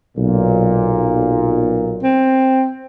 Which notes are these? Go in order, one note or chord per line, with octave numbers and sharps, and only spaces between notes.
B1 A#2
C4